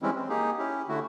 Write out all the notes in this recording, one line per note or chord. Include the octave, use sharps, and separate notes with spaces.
E3 G3 G#3 C4 C#4 E4
C4
A#3 D#4 G4 G#4
C#4 E4 G4
D3 A3 E4 F#4